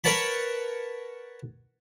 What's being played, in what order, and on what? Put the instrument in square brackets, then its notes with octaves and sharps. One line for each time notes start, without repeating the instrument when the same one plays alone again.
[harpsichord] A#4 B4 C#5 F#5 A5 B5